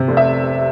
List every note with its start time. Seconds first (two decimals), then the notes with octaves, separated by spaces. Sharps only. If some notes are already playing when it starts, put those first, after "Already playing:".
Already playing: C3
0.08 F1
0.17 E5